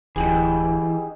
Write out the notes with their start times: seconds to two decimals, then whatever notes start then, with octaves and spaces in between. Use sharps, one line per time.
0.16 D1 E3 D#4 G4 G#4